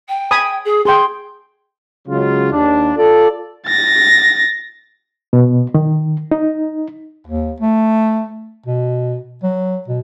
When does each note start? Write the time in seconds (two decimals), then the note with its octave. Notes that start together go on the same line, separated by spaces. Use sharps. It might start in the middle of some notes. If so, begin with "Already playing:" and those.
0.08 G5
0.31 G#5 B5 D#6
0.64 G#4
0.85 G#4 G5 C6
2.08 C#3 F#3 G#3 F4
2.52 D#2 D4
2.97 F4 A4 D5
3.67 A6 A#6
5.33 B2
5.74 D#3
6.31 D#4
7.27 D#2
7.60 A3
8.66 B2
9.43 F#3
9.88 B2